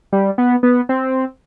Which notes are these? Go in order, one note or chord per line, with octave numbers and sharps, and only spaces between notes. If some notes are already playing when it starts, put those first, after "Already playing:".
G3
B3
B3
C4